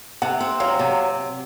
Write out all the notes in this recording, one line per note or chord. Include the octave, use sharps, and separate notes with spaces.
C3 F#5
C4
F#3 F5
C3